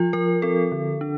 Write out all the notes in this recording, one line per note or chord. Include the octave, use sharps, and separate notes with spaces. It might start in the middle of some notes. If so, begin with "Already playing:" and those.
Already playing: F3 F4
F3 A#4
C4 A4
D3
D4